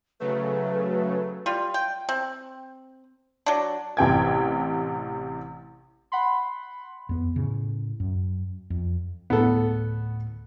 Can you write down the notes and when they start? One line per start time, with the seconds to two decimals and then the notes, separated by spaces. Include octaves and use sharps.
0.20 C#3 F#3 A3 B4
1.46 G3 F4
1.74 G5
2.09 C4
3.46 F#3 D4
3.97 A1 C3 G5 G#6
6.12 F#5 B5 C6
7.09 F2 B3
7.36 A2 C#3
8.00 F#2
8.70 F2
9.30 D2 A2 B3 A4